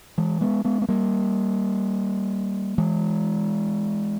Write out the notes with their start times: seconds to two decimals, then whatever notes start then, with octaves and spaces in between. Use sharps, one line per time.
0.18 E3 G#3
0.41 G#3 B3
0.65 G#3 B3
0.82 B3
0.89 G3 A#3
2.78 E3 G#3